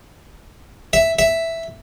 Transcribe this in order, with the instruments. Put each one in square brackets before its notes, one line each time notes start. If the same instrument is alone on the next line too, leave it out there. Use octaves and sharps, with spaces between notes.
[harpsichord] E5
E5